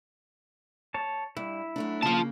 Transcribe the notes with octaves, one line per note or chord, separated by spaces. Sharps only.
C#5 A5
G2 E4
F#2 A3 D4
C#3 A#3 F4 A5